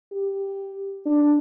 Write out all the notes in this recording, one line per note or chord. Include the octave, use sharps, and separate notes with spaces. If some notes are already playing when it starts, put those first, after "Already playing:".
G4
D4